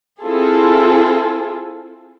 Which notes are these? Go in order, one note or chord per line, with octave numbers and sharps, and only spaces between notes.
C4 E4 F4 G#4 A4